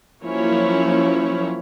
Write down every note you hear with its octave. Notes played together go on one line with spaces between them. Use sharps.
F3 F#3 A#3 C#4 E4 C#5